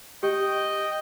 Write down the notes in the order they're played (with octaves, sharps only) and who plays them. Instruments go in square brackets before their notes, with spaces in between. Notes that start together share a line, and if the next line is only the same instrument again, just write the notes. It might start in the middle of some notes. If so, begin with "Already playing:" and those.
[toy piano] G4 [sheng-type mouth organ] D#5 G5